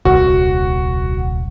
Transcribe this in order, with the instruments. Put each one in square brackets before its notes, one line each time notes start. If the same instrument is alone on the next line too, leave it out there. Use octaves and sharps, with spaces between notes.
[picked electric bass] D#1 C2 [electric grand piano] F#4